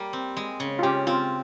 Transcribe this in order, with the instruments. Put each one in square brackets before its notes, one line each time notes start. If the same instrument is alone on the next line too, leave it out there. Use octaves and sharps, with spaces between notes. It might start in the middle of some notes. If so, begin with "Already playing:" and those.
Already playing: [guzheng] G3 A#3
C4
G#3
C#3
[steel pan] F4
[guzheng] C#3 [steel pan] G4
[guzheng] C4 [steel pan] F4